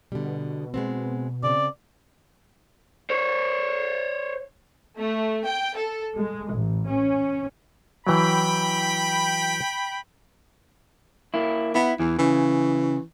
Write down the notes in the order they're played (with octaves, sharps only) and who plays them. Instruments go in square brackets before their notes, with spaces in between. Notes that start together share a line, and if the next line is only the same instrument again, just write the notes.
[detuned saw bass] B2 [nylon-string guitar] D3 G3
[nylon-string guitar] G#3 B3 C4
[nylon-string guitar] C#3 C4 [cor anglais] D5
[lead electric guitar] C5 C#5
[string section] A3
G5
A4
G#3
A1
C#4
[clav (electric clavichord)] E3 F#3 [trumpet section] G5 B5
[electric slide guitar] A#3 E4
[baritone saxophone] B3 [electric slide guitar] E4
[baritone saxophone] E2 [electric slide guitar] E3
[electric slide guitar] C#3 [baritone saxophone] E3